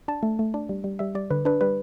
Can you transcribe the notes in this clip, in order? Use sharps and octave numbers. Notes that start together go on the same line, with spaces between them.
D4 A5
A3
A3
D4
G3
G3
G3 E5
G3 D5
D3 B4
D4 B4
G3 B4